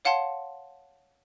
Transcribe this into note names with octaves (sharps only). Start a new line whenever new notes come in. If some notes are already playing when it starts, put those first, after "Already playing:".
C#5 F5 F#5 A5 C6